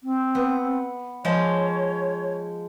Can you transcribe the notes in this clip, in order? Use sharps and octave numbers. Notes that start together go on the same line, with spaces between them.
C4
B3
F3 G#3 C#5